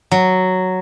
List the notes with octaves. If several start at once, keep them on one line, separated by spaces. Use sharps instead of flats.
F#3